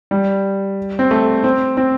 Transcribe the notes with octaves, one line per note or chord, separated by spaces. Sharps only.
G3
C4
A3
C4
C4